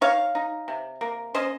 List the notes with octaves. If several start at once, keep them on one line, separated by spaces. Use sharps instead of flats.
D#4 C#5 F5
D#4
C3
A#3
C#4 C5 D#5